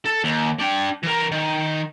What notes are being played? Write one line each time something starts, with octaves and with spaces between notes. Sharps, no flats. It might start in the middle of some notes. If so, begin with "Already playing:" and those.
A4
D#2
D4 G5
E3 A#4
D#3